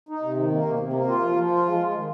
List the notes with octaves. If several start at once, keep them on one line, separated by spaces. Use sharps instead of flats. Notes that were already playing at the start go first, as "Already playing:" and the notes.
D#4
C3
D#3
A#3
C3
C3
A#3
F4
F3
F3
F4
G#3
G#3
D#3